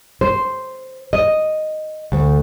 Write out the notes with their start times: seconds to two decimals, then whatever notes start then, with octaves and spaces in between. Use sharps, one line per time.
0.21 C5
1.13 D#5
2.12 D2